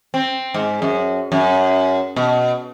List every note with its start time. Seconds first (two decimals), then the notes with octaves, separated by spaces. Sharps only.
0.14 C4
0.54 G#2
0.82 F#2
1.32 F#2
2.16 B2